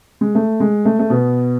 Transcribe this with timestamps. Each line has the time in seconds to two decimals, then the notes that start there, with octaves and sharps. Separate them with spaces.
0.21 G#3
0.35 A3
0.60 G#3
0.85 A3
0.99 A3
1.10 B2 B3